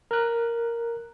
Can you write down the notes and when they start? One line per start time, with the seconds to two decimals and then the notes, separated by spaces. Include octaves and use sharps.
0.11 A#4 F#6